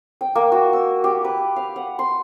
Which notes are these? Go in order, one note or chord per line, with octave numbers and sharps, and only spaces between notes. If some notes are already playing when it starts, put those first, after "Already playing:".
G5
A#3
F#4
E6
G4
B4
F5
F#5
C6